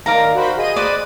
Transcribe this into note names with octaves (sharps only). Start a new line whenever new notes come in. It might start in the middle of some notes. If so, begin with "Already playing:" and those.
D#3 A#4 D5 F5 A#5
F#4 C5 B5
G#4 D#5 D#7
B4 C5 D5